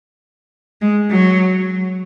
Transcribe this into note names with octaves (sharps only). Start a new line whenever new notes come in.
G#3
F#3